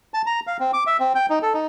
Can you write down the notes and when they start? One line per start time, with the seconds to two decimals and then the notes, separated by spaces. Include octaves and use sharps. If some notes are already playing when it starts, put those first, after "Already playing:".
0.14 A5
0.26 A#5
0.47 F5
0.60 C4
0.73 D6
0.87 E5
1.00 C4
1.15 G5
1.30 D#4
1.42 A4
1.54 D#4